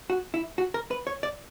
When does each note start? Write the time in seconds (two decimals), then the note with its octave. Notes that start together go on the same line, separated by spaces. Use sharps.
0.10 F#4
0.34 E4
0.58 F#4
0.74 A#4
0.91 B4
1.07 C#5
1.23 D5